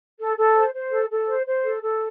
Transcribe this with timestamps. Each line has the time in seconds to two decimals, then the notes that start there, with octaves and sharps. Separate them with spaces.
0.19 A4
0.37 A4
0.55 C5
0.74 C5
0.92 A4
1.10 A4
1.28 C5
1.46 C5
1.64 A4
1.83 A4